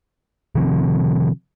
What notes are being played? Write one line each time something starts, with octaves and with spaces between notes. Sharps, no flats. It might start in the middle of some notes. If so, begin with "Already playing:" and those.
C3 D#3 F3 C4